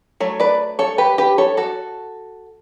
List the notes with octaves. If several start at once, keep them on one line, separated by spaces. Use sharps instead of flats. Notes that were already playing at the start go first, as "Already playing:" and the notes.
F#3 A3 C#5
B4 D5
A4 C#5
G4 B4
G4 B4
A4 C#5
F#4 A4